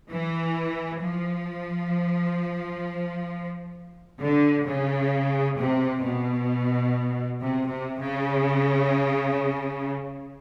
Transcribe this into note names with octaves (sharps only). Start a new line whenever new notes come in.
E3
F3
D3
C#3
C3
B2
C3
C3
C#3